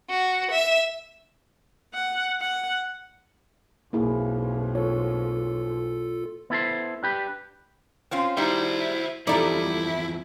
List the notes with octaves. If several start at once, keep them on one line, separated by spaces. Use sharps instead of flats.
F#4
E5
F#5
F#5
B1 F2 A#3 E4 G#4
F4 A4 C#5
B3 E4 A4 C5
D4 G4 B4
C4 C#4 F4
G3 D#4 E4 F#4 C5
E2 G2 F3 G3 D#4 E4 A4 D5